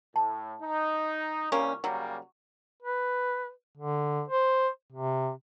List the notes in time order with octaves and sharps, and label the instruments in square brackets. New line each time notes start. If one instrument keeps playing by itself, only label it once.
[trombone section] A2 [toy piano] A5
[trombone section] D#4
[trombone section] C2 A#2 G3 [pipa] A#3 C#4 [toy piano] C#6
[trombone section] C#3 G3 A#3 [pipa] F#3
[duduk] B4
D3
C5
C3